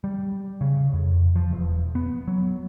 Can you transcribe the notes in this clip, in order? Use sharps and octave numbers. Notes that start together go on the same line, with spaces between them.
G3
C#3
F2
F3
E1
B3
F#3